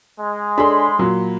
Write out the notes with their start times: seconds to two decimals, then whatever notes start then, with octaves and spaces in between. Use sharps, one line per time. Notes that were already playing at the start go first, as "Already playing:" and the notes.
0.20 G#3
0.58 D4 G#4 A4 B5 C6
0.99 A#2 F#3